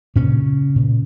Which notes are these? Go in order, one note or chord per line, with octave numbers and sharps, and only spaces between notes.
A#2 C#3 C#4
A#2